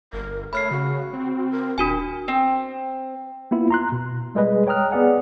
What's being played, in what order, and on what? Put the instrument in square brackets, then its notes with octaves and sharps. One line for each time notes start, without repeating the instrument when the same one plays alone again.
[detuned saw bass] G1 [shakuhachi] A#4
[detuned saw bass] A3 [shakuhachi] C#5 [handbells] B5 F6 C7
[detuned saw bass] C#3 [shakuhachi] F#4
[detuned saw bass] C4
[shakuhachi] A#4
[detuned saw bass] D#1 [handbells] D4 F#4 G#5 [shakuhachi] A#4
[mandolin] C4
[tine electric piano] A#3 B3 E4 F4
A#5 C6 F#6
B2
G3 G#3 G#4 B4 D#5
C#5 G5 A#5 D#6 F6 F#6
B3 G#4 D5 F#5 G#5